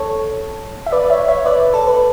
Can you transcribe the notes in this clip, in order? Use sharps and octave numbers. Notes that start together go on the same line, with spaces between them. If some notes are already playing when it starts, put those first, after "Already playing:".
Already playing: A4 C#5
E5
B4 D5
C#5 E5
C#5 E5
B4 D5
A4
B4